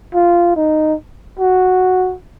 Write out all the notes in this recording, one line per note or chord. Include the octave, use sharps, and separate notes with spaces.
F4
D#4
F#4